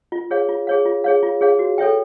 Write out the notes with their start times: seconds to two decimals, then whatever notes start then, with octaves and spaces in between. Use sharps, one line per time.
0.12 F4
0.31 G#4 C#5 F5
0.49 F4
0.67 G#4 C#5 F5
0.86 F4
1.04 G#4 C#5 F5
1.23 F4
1.41 G#4 C#5 F5
1.59 F#4
1.78 A4 C#5 E5 G5